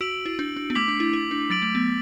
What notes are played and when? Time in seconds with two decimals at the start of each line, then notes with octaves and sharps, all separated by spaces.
0.01 F#4 E6 D7 F#7
0.26 E4
0.39 D4
0.57 D4
0.70 B3
0.75 A3 D6 B6 F#7
0.88 D4
1.00 E4
1.13 E4
1.31 D4
1.50 F#3 A6 D7 F#7
1.62 A3
1.75 B3